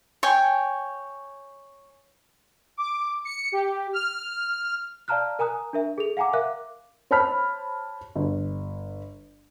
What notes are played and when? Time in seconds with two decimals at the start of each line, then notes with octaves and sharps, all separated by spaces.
0.23 C#5 G5 G#5
2.77 D6
3.25 C#7
3.52 G4
3.93 F6
5.08 D5 F5 A5 A#5 F6 F#6
5.39 A#4 G#5 A#5 D#6 F#6
5.73 D4 A#4 E5
5.98 G#4 A4 F7
6.17 F5 F#5 G#5 A#5 D6
6.33 A#4 E5 F5 D6 F#6
7.11 C5 C#5 A5 B5 F6 B6
8.16 G1